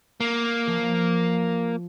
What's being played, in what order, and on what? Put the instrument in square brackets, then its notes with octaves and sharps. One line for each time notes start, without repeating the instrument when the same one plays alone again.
[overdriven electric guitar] A#3
[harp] F3